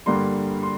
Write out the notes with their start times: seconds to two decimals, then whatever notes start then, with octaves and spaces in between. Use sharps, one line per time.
0.06 G2 D3 G3 A#3 C6
0.63 C6